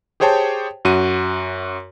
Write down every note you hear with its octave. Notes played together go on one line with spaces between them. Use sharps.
G4 G#4 C5 C#5 G5 A5
F#2 F#4 D#7